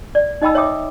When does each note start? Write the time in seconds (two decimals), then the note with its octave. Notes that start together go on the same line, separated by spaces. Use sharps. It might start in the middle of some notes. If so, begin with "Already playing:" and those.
0.15 D5
0.42 D#4 D#5 G5 B5 E6
0.55 C#5 E5 G5 D6 D#6